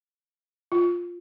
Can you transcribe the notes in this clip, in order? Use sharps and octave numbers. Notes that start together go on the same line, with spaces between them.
F4